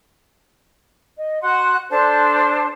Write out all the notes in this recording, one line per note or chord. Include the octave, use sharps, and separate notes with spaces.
D#5
F#4 F#5 C6 F#6
D4 A4 C5 A5